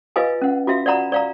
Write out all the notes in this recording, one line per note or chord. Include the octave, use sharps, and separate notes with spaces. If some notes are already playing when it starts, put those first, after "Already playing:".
F4 B4 D#5 F5 G#5
C#4 F#5
F4 F#4 E5 F5
D5 F5 F#5 A#5 B5
D5 F5 A#5